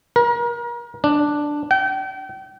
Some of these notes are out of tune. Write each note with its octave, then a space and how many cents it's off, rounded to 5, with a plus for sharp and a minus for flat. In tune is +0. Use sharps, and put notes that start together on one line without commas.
A#4 +35
D4 +5
G5 -35